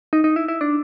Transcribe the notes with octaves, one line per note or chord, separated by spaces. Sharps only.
D#4
D#4
E4
E4
D4